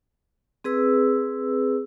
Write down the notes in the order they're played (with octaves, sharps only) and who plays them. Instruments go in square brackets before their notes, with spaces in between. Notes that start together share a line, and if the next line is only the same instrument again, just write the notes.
[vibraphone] C4 G#4 B4 E6